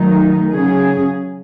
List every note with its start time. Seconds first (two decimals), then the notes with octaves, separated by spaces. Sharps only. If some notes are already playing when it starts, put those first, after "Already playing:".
Already playing: D#3 F#3 A3 D#4
0.51 C#3 F#3 C#4 G#4